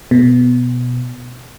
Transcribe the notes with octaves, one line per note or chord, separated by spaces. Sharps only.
B2